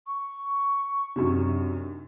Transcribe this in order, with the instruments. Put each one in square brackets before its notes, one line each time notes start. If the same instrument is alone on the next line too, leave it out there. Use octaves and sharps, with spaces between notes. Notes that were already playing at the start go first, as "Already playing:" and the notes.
[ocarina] C#6
[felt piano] F#2 C3 [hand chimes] D4 D#4 G4